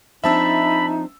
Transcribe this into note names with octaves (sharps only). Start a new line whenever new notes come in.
F3 C4 D4 D#4 E5 A5 B5 E6